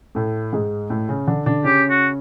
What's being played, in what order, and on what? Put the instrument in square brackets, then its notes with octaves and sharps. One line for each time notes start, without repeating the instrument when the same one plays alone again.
[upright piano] A2 A3
G#2 G#3
A2 A3
C#3 C#4
D3 D4
D3 D4
[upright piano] C#3 C#4 [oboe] G4
[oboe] F#4